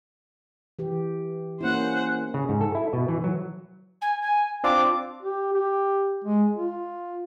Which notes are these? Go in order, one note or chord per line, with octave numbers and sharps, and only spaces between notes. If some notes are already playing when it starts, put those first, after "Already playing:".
E3 G4
A#3 C#4 E4 C5 F#5
C#3
G#2
A4
E4
B2
E3
F#3
G#5
G#5
C4 D4 F4 D6
G4
G4
G#3
F4